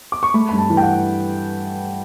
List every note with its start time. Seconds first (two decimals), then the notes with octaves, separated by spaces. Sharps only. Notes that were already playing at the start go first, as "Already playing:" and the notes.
0.12 D6
0.23 C#6
0.34 A3 B5
0.49 G2 B5
0.58 A5
0.70 E3
0.77 G5
0.82 F#5